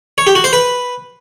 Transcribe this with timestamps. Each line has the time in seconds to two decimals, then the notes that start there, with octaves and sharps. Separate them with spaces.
0.18 C#5
0.27 G4
0.35 F#4
0.44 C5
0.53 B4